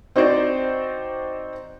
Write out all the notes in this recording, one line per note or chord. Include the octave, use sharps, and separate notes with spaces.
C4 D#4 F#4 C5 D5